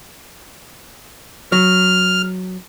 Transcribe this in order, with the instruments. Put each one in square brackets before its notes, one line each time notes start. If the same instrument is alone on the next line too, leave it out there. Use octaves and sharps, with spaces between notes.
[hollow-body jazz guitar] F#3 [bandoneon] F6